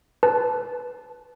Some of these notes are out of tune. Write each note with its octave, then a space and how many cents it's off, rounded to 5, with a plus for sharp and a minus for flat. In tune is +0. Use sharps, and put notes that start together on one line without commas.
B4 +0 A5 -15